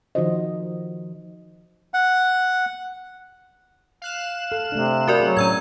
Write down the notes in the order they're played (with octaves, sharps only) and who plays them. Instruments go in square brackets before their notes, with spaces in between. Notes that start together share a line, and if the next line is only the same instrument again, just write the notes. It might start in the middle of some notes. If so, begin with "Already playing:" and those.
[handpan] D#3 F3 D#4 F#4 C5 D#5
[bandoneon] F#5
[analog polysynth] F5 F#6 E7
[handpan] A4
[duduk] C3 [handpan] A3 D4
[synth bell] F#4 A#4 D5 [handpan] G4
[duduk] F#3 [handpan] C4 G#4
[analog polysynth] A2 [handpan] C#4 F#4 [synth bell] A#5 E6 G#6